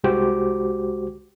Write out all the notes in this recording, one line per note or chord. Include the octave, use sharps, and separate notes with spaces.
C2 G#3 F#4 G4 C5 D6